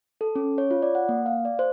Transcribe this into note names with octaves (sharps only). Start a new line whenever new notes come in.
A4
C#4
C#5
F4
D5
F#5
A#3
F5
D5
C5